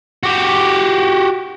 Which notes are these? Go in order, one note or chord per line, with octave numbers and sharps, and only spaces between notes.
F#4 G4